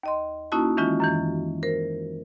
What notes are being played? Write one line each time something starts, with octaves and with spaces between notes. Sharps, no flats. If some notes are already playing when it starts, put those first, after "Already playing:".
D#2 D#5 C6
A#3 C#4 D#4 E4 F#4 A5
D#3 E3 G#3 C#4 F4
F#2 D#3 E3
A#4 C5